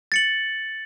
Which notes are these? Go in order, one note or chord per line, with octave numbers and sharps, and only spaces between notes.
A6 C#7 F#7